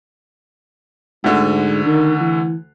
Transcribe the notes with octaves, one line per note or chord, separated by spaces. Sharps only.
D2 G#2 D3
D#3
E3